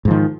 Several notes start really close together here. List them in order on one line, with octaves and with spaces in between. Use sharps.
G#2 F3 D#3